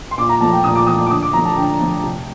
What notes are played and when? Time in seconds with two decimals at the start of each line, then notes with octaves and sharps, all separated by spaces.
0.11 C6
0.18 A#2 D6
0.29 A#5
0.40 F3 A3 A5
0.52 G5
0.64 A#2 D#6
0.75 D6
0.87 F3 A3 D#6
1.06 D6
1.10 D3 D#6
1.22 D6
1.33 F3 A3 A#5
1.45 A5
1.56 D3 G5
1.79 F3 A3
2.03 C3